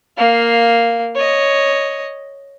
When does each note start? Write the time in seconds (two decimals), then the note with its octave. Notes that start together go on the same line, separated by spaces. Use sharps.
0.18 A#3 F5
1.16 C#5 D#5